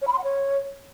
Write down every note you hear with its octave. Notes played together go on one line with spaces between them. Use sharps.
C#5
B5
C6
F#5
C#5